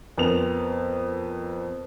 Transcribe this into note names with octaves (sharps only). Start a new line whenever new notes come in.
F2 B3 A#4 F7